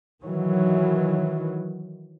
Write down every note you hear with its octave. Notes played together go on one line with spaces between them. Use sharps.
D#3 E3 F#3